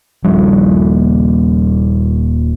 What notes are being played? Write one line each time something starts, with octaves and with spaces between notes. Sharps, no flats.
D#1 F3 G3 D4